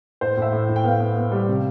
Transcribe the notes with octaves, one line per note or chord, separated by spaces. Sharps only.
A2 C5
A2 E5
A2
A2
G5
B3 F5
B3
B3
G3
C3